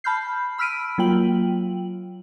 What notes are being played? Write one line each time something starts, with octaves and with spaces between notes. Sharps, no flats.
A5 B5 F6 G6 C7
B5 E6 F6 B6 D7 D#7
F#3 A#3 F4 G5 F#7